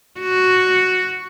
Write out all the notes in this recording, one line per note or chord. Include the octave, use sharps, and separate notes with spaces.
F#4